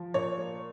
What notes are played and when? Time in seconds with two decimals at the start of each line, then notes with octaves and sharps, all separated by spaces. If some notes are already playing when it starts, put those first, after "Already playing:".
Already playing: F3
0.14 A#2 C#5
0.38 A#3